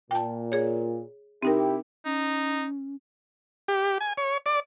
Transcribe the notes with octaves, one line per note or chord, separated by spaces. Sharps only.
A#2 G5 A5
G#4 C#5
C3 C4 D#4 E4 G4 A#4
C#4 D#4
G4
G#5
C#5
D5